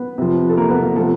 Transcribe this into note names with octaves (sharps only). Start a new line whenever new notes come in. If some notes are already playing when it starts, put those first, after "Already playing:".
Already playing: B3 B4
C3 F3
A4
A#3 A#4
B3 B4
A#3 A#4
C3 F3 A3 A4